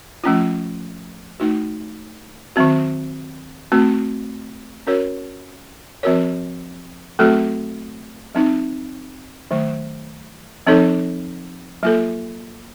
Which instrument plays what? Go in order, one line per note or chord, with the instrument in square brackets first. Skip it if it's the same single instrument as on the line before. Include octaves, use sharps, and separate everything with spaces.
[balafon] F3 A3 C#4 F4
A3 D#4 F#4
D#3 F#3 C4 F#4
A3 C4 F#4
C#4 F#4 A#4 C#5
F3 C4 F#4 A#4 C#5
F#3 A3 C4 F#4 A4
F#3 C4 D#4
D#3 F#3 A3
F3 C4 D#4 A4 C#5
F#3 A#3 F4 A4